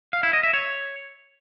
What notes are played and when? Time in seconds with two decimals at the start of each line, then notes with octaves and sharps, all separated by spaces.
0.13 F5
0.23 E4
0.33 D#5
0.43 E5
0.53 C#5